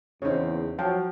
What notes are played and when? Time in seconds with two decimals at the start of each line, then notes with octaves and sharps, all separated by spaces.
0.22 E2 C#3 C4 D#4 C#5
0.79 F3 F#3 F5 G5